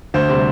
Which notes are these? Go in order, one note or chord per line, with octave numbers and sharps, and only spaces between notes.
D2 C5
C3 G3 C5